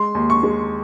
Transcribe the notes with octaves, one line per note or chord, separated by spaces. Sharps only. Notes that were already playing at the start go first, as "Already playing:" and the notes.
Already playing: G#3 C6
D#2
C#6
G#3